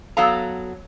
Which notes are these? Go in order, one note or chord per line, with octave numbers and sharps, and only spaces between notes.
F#3 B3 A4 F5 A#5